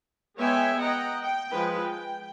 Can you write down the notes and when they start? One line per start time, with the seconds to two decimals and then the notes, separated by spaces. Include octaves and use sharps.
0.38 G#3 B3 C#5 E5 G5 G#5
0.80 D#5 F#5 G5 A#5
1.22 G5
1.52 F3 G#3 B4
1.83 G5